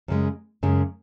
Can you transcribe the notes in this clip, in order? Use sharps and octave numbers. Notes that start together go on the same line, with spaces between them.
F#2 C#3 G#3
F#2 C#3 G#3